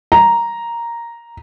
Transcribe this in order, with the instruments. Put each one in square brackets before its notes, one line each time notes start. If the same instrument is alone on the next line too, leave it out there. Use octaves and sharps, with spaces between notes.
[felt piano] A#5